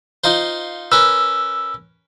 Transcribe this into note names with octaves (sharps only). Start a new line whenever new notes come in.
D#4 F4 C5
C#4 A#4 B4 E6